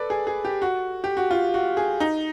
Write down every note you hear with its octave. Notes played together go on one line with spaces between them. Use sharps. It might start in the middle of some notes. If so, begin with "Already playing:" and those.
Already playing: A4 B4 D5
G#4
G#4
G4
F#4
G4
F#4
F4
F#4
G#4
D#4